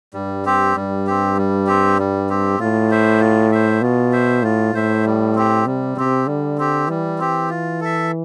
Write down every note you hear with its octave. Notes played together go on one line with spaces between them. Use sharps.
G2 G3
C4 G4
G2 G3
C4 G4
G3
C4 G4
G3
C4 G4
A2 F4
C5 E5
F4
C5 E5
B2 F4
C5 E5
A2 F4
A2 C5 E5
G3
C4 G4
C3 G3
C3 C4 G4
D3 G3
C4 G4
E3 G3
C4 G4
F4
A4 E5